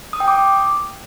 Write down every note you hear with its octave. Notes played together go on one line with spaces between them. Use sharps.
D#6
G5
D6